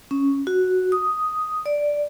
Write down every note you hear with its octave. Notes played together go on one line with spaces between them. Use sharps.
C#4
F#4
D#6
D5